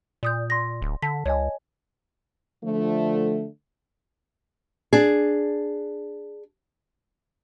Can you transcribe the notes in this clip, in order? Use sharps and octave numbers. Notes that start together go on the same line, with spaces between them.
A#2 D5 D#6 G6
C6 A#6
D1
D3 A5 B6
C#2 C#5 D#5 G#5
D3 F3 A3
D4 G#4